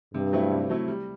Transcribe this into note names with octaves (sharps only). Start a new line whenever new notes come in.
G2 C3
F#3 A3 C4 E4
C3
F#3 A3 C4 E4
G3